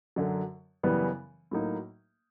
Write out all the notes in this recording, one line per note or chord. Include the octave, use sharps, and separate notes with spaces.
F#2 D3 F#3
F#2 C#3 E3 G3 B3
A2 F#3 A#3 D#4